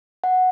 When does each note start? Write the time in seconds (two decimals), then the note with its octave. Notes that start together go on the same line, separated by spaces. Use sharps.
0.24 F#5